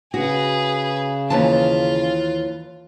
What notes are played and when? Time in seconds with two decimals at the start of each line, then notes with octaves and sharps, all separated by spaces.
0.14 C#3 F#4 G#4 B4
1.30 D#2 E3 F4 A5